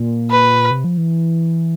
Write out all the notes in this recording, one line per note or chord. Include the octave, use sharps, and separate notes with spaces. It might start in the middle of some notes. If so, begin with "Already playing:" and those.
Already playing: A#2
B4
C3
F3
E3